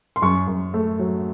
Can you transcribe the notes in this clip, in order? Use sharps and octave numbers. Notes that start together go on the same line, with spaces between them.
C6
F#2 C#6
F#2
A3
F#3